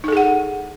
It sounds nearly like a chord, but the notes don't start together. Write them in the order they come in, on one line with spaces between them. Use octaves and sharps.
D#4 A4 G#4 F#5